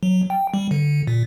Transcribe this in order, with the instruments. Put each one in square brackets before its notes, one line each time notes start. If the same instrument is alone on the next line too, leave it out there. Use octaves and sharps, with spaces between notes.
[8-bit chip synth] F#3
G5
G3
D3
A#2